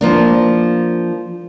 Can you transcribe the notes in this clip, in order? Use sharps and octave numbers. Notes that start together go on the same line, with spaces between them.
F3 A#3 D4